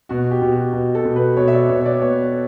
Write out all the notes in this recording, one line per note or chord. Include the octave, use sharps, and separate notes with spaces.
B2 F#4
G4
B2
F#4
B2
A4
B2
B4
B2 C#5
E5
D5
B2 C#5
C#5
D5
B3 C#5